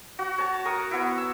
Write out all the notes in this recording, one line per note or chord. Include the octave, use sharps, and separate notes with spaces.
F#4
C#5 A5
A#4 C#6 D#6
B3 E4
E6